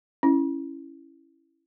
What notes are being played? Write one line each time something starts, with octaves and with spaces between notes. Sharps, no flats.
C#4 E4